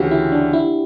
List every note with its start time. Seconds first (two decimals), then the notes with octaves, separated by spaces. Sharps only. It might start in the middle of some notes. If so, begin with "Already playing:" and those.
Already playing: D2 C#3 E3 F#4 G4
0.11 E4
0.32 D4
0.53 E4